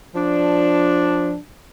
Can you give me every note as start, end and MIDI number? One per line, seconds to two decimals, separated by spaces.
0.15 1.36 53
0.15 1.36 62